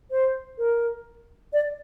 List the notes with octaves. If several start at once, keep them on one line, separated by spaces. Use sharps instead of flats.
C5
A#4
D5